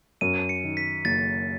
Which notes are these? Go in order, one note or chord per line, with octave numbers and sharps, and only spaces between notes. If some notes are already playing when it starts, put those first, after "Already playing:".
F#2 D#7
C#7
D#3
B6
F#1 A6